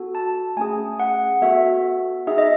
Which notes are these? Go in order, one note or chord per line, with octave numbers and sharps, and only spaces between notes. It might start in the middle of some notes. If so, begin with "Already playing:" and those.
Already playing: B3 F#4 A4
A5
A3 C#4 G#4 G#5
F#5
B3 F#4 A4 E5
D#4 G#4 E5
D#5